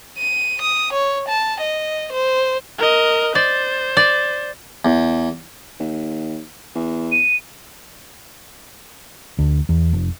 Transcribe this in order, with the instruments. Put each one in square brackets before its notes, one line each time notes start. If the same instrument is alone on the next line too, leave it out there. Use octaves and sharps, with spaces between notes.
[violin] D#7
D#6
C#5
A5
D#5
C5
[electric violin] A#4 D#5
[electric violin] C5 [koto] D5
[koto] D5
[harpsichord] E2
[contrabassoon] D#2
E2
[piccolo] D#7
[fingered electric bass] D2
E2
F1